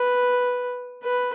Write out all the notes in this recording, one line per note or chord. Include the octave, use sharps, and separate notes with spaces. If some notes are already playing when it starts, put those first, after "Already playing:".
Already playing: B4
B4